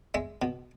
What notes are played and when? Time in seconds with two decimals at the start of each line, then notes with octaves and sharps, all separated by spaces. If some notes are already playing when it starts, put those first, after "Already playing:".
0.14 G#3 E5
0.42 B2